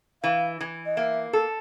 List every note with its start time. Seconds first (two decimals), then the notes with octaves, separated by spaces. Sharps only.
0.23 E3 F5
0.61 E3
0.86 D#5
0.97 A#3 E5
1.33 A4